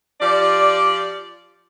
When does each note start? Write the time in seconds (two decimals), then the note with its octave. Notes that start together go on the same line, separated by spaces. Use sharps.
0.21 F3 G4 D5